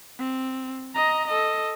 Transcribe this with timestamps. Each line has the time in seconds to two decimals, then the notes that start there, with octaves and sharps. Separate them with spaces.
0.19 C4
0.94 D#5 A#5
1.27 A4 D#5